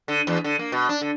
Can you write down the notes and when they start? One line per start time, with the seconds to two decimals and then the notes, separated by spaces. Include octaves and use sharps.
0.08 D3
0.27 E2
0.44 D3
0.59 A#3
0.72 B2
0.89 D4
1.02 D3